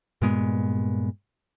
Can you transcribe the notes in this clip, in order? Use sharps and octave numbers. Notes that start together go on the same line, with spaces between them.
G2 A#2 G#3 B3